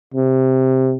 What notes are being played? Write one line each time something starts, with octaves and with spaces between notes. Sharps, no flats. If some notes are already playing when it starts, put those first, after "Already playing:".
C3